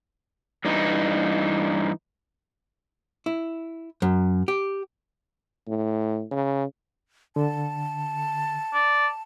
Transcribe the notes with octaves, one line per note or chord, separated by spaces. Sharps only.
G2 E3 D#4
E4
F#2
G4
A2
C#3
D3 A5
D5